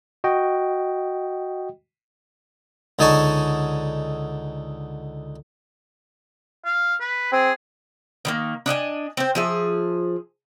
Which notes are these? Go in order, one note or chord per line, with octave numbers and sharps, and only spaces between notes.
F#4 D#5 G5
C#2 D3 D#4 G#5 A5 C#6
F5
B4
C4 G#4
D#3 G3 A#3
D4 D#5 E5 G#5
C4 C5
F3 G#4 E5